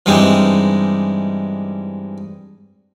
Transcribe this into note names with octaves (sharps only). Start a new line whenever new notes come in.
G2 E3 G3 G#3 C4 D#4